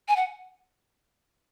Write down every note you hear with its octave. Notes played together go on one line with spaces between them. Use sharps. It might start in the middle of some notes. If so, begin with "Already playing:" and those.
G#5
F#5